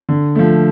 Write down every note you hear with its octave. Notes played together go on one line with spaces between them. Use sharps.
D3
F3 A3